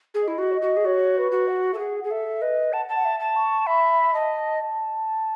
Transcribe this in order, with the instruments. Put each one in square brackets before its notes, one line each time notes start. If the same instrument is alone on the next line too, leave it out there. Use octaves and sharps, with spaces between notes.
[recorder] G#4
[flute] D#5
[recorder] E4
F#4
[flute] C#5
D#5
[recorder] F#4
G#4
[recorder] F#4 [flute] C#5
[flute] B4
[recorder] F#4
[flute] F#5
[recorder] A4 [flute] E5
[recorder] G#4 [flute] F#5
[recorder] G#4 [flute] F#5
[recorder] A4 [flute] E5
[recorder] B4 [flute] D#5
[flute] F#5 [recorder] A5
[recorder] A5
[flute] F#5
E5
[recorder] A5
[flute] C#6
[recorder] E5 [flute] B5
[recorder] D#5 [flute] A5